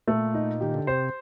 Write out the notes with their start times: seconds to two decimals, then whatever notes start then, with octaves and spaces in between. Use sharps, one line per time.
0.07 A#2 A3
0.34 D#4
0.61 D#3 G4
0.74 D3
0.87 C3 C5